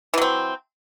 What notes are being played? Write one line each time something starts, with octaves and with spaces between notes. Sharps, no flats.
E3 F#3 C4